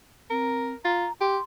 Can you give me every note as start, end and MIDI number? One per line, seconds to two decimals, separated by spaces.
0.30 0.74 60
0.30 0.76 70
0.85 1.07 65
0.85 1.13 82
1.21 1.37 67
1.21 1.43 84